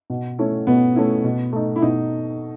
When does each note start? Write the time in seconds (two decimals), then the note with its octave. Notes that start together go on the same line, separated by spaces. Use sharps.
0.10 B2
0.39 A3 C#4 E4
0.67 B2 B3
0.96 A3 C#4 E4
1.24 B2
1.53 A3 D#4
1.76 E4
1.82 B2 D#4